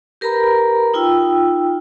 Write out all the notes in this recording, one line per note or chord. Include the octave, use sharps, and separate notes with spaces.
G4 A#4 B4 A#5 B5
D#4 F4 G5 E6